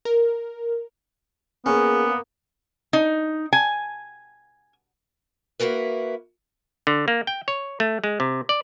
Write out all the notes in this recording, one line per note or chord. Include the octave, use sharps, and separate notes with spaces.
A#4
A#3 B3 C#4 G#4
D#4
G#5
A#3 E4 F#4 A#4 B4
D3
A#3
G5
C#5
A3
G#3
C3
D5